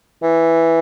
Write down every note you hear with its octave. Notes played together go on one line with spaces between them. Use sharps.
E3